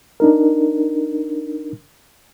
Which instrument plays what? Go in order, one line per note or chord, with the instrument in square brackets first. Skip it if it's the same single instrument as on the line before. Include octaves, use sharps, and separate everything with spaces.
[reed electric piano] D4 D#4 A#4